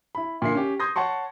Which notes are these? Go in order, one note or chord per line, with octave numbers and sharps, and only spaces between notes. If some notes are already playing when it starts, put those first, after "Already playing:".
E4 B5
A#2 D3 E5 C7
C#4 G4
C6 D#6 G6 G#6 A#6
C#5 F#5 A5 C6 C#6